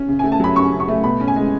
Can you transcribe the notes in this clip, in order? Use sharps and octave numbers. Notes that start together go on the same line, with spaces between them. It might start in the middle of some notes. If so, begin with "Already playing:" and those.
Already playing: C#4
C#3
A3 G#5
A5
F#3 B5
C#4 C#6
C#3
C#6
A3
B2 B5
C#4
G#5
G#3